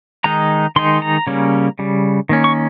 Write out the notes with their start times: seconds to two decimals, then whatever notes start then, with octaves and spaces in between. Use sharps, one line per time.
0.24 D#3 G#3 D#4 A#5
0.76 D#3 G#3 D#4 C6
1.02 A#5
1.27 C#3 G3 A#3 C#4
1.79 C#3 G3
2.29 D#3 A#3 C#4
2.44 C#6